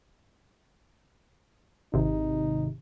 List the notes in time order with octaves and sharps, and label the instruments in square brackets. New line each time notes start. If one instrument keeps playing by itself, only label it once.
[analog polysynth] G#1 C3 [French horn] D#4